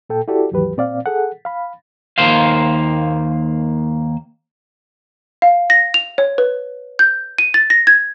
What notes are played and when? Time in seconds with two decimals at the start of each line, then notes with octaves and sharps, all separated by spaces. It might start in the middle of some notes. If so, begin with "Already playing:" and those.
0.10 A#2 A4 G5
0.28 E4 F#4 G4 A4 D5
0.52 D#2 G#2 E3 F#3 G4 B4
0.77 A#2 C4 D5 F5
1.06 G#4 A4 F#5
1.45 F5 B5
2.18 D#2 D#3 A#3 C5 F5
5.42 F5
5.70 A#6
5.94 F7
6.18 C#5
6.38 B4
6.99 G6
7.38 D#7
7.54 A6
7.70 A#6
7.87 G#6